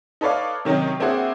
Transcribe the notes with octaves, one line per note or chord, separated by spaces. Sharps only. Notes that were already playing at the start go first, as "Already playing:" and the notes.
D#4 A4 B4 C#5 D5 F5
C3 D#3 F#3 C#4 D#4
A#3 C4 D4 E4 F#4 G#4